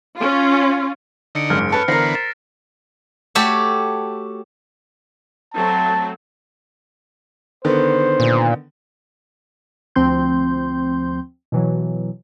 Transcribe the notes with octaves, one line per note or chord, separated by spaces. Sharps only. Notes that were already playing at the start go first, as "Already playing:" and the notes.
C#4 F4
D3 D#4 E6 C#7 D7
F#1 G#2 F6
C#4 A4 B4 A5 C#7
D3 E3 B3 A#4 C5 A#6 C7
B6
A6 E7
A3 F#4 G4 A4 C#5
F#3 A3 C4 A5
D3 D#3 B3 C5
A#2
D2 F3 C4 C6 G6
B2 E3 F#3